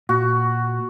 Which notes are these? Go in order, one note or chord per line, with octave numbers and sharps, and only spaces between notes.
A#2 F#4